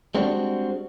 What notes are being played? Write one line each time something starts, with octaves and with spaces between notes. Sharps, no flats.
G3 G#3 C4 D4 F#4